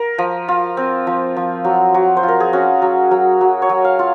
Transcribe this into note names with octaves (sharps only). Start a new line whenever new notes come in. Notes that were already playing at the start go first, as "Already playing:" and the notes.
Already playing: A#4
F3
F4
C4
F3
F3
F#3
F#3
C5
F4
A#4
G#4
C#4 F#4
F#3
F#3
F#3
C#5
F#3
F5
F4